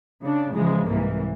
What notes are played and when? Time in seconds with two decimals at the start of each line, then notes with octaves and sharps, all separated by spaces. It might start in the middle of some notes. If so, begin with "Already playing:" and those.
0.22 C#3 D4
0.53 C#3 E3 F3 G#3
0.86 C2 G#2 E3 A#3